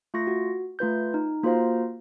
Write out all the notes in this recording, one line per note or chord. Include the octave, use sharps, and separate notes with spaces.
A3 F4 C#6 A#6
F#4
A3 F4 B4 G6
D#4
A#3 F4 F#4 C5 F5 A#5